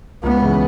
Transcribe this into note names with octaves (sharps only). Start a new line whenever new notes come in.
C#2 B3
C#3 E3